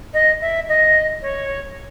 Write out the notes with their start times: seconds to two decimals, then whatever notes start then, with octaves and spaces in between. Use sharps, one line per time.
0.14 D#5
0.41 E5
0.69 D#5
1.22 C#5